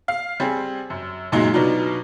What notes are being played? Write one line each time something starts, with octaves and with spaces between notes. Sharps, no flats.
F5
G3 C4 G#4
F#2
F#2 A#2 F#3 G#3 D#4
B2 F#3 B3 D4 D#4 F4